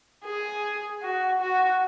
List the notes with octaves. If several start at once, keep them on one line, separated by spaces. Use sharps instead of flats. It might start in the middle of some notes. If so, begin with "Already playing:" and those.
G#4
F#4
F#4